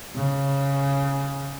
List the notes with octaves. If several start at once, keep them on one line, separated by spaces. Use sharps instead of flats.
C#3